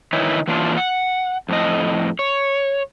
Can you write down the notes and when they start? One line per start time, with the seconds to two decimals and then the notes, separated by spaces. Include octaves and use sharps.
0.13 D#3 E3 D#4 E4 B4 C#5
0.48 E3 F#3 A#3 D4 F4
0.77 F#5
1.49 F2 A2 D#5
2.19 C#5